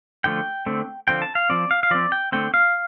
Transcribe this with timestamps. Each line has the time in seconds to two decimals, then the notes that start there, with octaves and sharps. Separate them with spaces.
0.24 D3 F3 A3 G5
0.66 D3 A3 C4
1.08 D3 F3 C4 G5
1.22 A5
1.35 F5
1.49 F3 C4 D5
1.71 F5
1.83 F5
1.91 F3 C4 D5
2.12 G5
2.32 D3 A3 C4 G5
2.54 F5